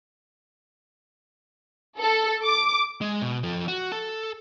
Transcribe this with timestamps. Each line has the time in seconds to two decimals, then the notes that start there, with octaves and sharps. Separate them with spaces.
2.00 A4
2.45 D6
3.01 G#3
3.22 B2
3.43 F3 A4
3.68 F#4
3.92 A4 A5